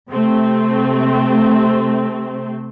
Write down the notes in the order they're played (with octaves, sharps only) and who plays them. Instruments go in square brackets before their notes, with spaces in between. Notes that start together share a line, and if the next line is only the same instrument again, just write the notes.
[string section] C3 A3 C4